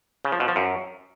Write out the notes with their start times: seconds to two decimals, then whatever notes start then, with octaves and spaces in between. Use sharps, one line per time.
0.25 C#3
0.32 F3
0.40 B2
0.48 F3
0.56 F#2